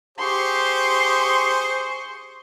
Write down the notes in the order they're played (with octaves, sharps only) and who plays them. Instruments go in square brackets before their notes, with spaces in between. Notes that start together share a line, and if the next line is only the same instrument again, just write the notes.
[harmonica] G4 G#4 C5 [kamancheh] C6 C#6